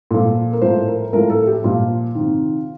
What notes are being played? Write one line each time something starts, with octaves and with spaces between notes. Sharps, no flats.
A#2 F3 A4
A#4
A2 F3 C5
A#4
A2 F3 A#4
A4
G4
A#2 F3 F4
C3 D#3